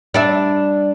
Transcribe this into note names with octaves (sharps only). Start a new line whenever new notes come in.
G3 D4 E5